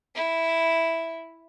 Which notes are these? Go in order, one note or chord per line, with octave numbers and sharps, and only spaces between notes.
E4